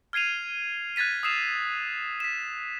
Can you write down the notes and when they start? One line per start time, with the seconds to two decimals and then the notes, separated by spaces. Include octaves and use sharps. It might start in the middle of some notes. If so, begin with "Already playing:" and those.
0.13 F6 G#6 C7 D#7 F7
0.96 F#6 G#6 A6 B6 D#7
1.23 D#6 E6 C7 E7 F7
2.20 B6 E7